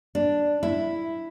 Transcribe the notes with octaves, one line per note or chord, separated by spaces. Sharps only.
D4
E4